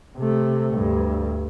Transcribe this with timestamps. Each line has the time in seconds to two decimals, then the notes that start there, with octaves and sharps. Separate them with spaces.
0.17 C3 A3
0.74 D2 G2